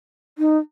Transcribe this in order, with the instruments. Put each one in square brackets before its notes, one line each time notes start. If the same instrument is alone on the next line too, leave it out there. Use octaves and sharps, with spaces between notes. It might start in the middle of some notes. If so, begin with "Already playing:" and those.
[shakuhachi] D#4